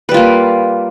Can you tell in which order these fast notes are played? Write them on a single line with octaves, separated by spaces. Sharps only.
B4 G3 F4 A#3